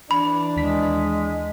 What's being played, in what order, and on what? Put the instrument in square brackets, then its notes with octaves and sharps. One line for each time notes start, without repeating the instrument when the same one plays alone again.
[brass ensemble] E3 D4 [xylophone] B5
[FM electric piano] D#2 B6 [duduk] G#3